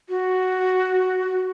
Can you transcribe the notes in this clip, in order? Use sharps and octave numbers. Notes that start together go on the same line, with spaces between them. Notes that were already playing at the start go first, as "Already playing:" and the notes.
F#4